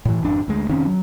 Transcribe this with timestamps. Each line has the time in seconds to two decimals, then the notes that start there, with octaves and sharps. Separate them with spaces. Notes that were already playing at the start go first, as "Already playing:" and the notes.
0.05 A2 E3
0.23 G#1 F2 D4
0.48 D2 G#3
0.69 F1 D#3 C4 C#4
0.86 F#3